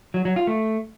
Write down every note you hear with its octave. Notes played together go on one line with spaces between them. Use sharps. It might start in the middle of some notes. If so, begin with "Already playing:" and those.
F#3
F#3
F4
A3